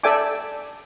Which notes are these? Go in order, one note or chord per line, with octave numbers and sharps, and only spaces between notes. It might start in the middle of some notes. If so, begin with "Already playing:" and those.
A4 D5 E5 G5 G#5 D6